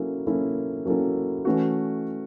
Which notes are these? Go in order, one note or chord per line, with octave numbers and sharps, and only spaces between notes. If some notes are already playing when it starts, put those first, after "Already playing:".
Already playing: F#3 A#3 C#4 E4 A4
F#3 A#3 C#4 E4 A4
F#3 A#3 C#4 E4 A4
E3 A3 C#4 F#4